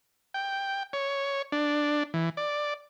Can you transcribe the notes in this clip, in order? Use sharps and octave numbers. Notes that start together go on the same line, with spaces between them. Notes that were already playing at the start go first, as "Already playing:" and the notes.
G5
C#5
D4
E3
D5